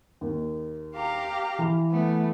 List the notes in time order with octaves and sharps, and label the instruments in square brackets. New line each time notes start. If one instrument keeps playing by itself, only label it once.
[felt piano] D#2
[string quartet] G4 F5 A#5
[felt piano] E3
[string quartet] A3 B3